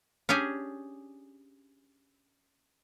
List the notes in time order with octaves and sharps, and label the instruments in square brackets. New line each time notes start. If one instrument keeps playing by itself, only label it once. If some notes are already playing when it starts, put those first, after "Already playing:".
[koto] C#4 D4 G4 G#4 G#5